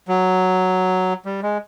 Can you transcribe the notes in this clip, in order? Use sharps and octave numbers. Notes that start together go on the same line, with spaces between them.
F#3
G3
G#3